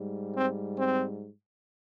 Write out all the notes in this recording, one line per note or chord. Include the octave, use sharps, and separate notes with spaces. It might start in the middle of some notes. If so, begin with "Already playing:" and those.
Already playing: G#2 G3
C4
C4